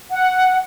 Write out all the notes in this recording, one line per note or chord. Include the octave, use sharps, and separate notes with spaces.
F#5